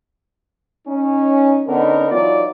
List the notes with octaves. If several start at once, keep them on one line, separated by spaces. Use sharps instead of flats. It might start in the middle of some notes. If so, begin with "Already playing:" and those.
C#4 D#4
D3 B3 C#4 D#4 A#4
E3 F#3 D#4 F4 D5